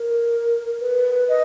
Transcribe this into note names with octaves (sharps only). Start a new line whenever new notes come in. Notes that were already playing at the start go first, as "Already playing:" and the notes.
Already playing: A#4
B4
D#5